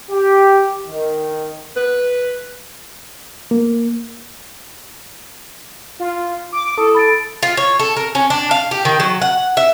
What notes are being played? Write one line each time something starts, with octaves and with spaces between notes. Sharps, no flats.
G4
D#3
B4
A#3
F4
D6
E4 A4 D#6
B5 A6 D7
F4
C#5
A4
A#4
C#4
D4
F5
G4
D#3
F#3
F#5
E5